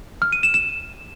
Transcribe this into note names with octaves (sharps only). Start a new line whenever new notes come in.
F6
D#7
E7
E7